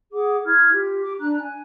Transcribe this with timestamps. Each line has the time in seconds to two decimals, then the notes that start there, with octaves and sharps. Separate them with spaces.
0.13 G#4 F#5 D6
0.45 E4 F6 G#6
0.72 F4 G4
1.02 D6
1.20 D4 A#5 F#6
1.37 G#5